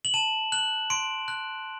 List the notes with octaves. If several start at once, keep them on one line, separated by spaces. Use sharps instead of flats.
F#7
A5 E7
F#6 F#7
C6 D7
F#6